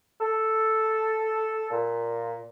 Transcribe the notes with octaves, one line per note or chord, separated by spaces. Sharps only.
A4
A#2